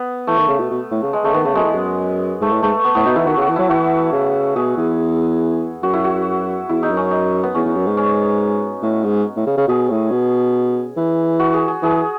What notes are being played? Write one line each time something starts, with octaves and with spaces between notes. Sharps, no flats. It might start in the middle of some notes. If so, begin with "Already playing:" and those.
Already playing: B3
E3 A3
D#3
C#3
B2
B2
A2
C#3
G#3
C#3 A3
D#3 B3
C#3 A3
F#2 G#3
E2
F#2
G#2 A3
A2
G#2 A3
B3
A2 B3
B2 D#4
E3 E4
D#3 F#4
C#3 F#4
E3
F#3 E4
E3 F#4
C#3
B2 G#4
E2
F#2 F#4
E4
F#4
E2 E4
D#4
F#2
C#4
D#4
B3
E2 C#4
E2
F#2
G#2
C#4
A2
G#2
A2
C#3
C#3
B2 G#4
A2
B2
E3
F#4
G#4
G#4
E3 G#4